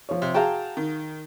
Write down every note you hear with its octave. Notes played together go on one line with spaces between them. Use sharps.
F3 C#5
C3
F#4 G#4 F5 G5 A5 A#5
D#3